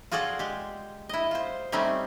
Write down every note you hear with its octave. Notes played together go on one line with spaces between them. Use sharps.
F4 F#4 G#4 A4 D5 F#5
G#3 G4
E4 D#5
F4 C5
G3 A3 C4 C#4 D#4 G4